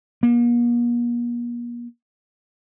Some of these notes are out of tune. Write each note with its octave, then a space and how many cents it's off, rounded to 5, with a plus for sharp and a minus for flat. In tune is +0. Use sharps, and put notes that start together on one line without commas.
A#3 +45